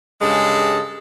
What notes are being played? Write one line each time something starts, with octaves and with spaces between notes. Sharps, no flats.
G2 C#3 G#3 A4